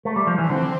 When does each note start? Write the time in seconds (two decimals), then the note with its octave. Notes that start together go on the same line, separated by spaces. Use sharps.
0.05 A3
0.16 G3
0.27 F3
0.38 E3
0.49 D3 C4